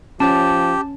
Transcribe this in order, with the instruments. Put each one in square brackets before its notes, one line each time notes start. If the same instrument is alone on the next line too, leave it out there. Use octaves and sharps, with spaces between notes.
[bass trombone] F3 [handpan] C#4 [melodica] G4 [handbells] A5